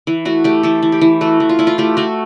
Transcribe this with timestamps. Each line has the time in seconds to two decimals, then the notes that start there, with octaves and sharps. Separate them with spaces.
0.07 E3
0.25 A3 F#4
0.44 A3 G4
0.63 E3 A4
0.83 E3
0.92 G4
1.01 E3
1.21 A3 F#4
1.40 E3
1.49 F4
1.59 A3 E4
1.67 F4
1.78 A3 G4
1.97 A3 F#4